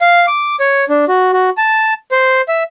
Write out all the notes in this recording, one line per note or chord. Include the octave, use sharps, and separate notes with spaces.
F5
D6
C#5
D4
F#4
F#4
A5
C5
E5